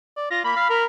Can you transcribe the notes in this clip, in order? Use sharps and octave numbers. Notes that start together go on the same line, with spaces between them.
D5
F4 A#6
A#3 B5
F5
A#4